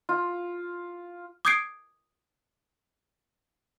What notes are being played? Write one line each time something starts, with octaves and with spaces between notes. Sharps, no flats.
F4
D6 D#6 G6 G#6 C7 D7